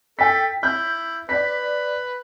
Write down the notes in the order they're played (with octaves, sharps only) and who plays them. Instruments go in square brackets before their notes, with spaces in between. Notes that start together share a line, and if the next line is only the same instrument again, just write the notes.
[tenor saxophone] A4 [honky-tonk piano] G5 B6
[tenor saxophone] E4 [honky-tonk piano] G6
[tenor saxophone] B4 [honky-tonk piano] D5 B6